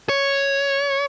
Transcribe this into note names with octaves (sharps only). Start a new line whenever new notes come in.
C#5